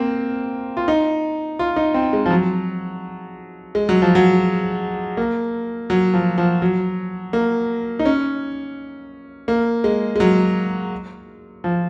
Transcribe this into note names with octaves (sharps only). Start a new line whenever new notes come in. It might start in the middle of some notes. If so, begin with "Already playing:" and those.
Already playing: A#3 C4
F4
D#4
F4
D#4
C4
G#3
F3
F#3
G#3
F#3
F3
F#3
A#3
F#3
F3
F3
F#3
A#3
D#4
C#4
A#3
G#3
G#3
F#3
F3